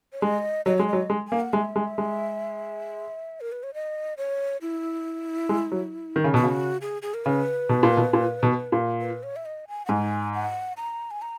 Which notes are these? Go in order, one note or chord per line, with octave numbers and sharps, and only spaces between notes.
C#5
G#3 D#5
F#3 D#5
G#3 C#5
D#5
F#3
G#3
A#3 G#5
F#5
G#3 E5
G#3
G#3
A#4
B4
C#5
D#5
C#5
E4
G#3
F#3
D#3
C#3
B2 F#4
C#3
G#4
G#4
A#4
C#3 B4
B2
A#2
B2
A#2
B2
A#2
B4
C#5
E5
D#5
G#5
F#5
G#2 G#5
F#5
A#5
G#5
A#5